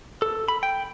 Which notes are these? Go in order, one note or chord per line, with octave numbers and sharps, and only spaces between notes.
A4
B5
G5